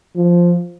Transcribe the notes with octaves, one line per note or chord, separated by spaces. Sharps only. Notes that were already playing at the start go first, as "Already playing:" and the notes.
F3